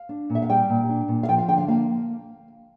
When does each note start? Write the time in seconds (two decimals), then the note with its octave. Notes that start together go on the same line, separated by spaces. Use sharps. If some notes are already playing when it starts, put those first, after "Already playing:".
Already playing: F5
0.09 D4
0.30 A#2
0.35 E5
0.42 F5
0.49 G3 G5
0.69 A#2
0.89 D4
1.08 A#2
1.23 F5
1.28 F3 G5
1.38 F5
1.48 D3 G5
1.58 F5
1.68 A#3 F5